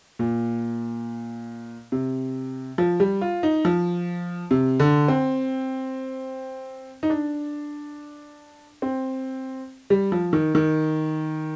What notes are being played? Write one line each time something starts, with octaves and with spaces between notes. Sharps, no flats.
A#2
C3
F3
G3
F4
D#4
F3
C3
D3
C4
D#4
D4
C4
G3
F3
D#3
D#3